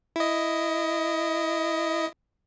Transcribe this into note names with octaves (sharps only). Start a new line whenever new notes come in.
E4 D#5